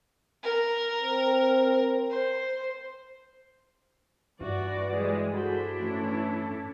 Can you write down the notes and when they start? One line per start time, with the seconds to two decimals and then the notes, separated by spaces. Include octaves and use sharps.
0.43 A#4
1.03 C4
2.11 C5
4.41 G2 E3 F#4 D5
4.94 G3 G#3
5.34 D4 E4 F#4 G#4 A4 C5 B5
5.80 A2 E3 A3 C#4 A4